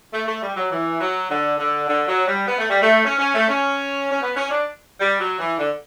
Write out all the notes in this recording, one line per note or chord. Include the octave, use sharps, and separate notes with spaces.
A3
A3
G3
F#3
E3
F#3
D3
D3
D3
F#3
G3
B3
A3
G3
A3
C#4
C#4
A3
C#4
C#4
B3
C#4
D4
G3
F#3
E3
D3